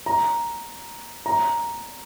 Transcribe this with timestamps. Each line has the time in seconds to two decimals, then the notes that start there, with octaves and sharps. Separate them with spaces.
0.06 A#5
1.26 A#5